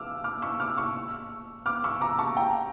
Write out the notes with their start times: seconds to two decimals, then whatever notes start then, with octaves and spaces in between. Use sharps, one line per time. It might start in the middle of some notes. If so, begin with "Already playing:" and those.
Already playing: D6 E6 F6
0.24 D6 F6
0.42 C#6 E6
0.60 D6 F6
0.77 C#6 E6
1.66 D6 F6
1.84 C#6 E6
2.01 A#5 D6
2.19 A5 C#6
2.37 G5 A#5